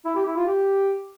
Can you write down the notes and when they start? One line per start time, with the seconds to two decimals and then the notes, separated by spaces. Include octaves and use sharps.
0.05 E4
0.16 G4
0.26 E4
0.37 F4
0.47 G4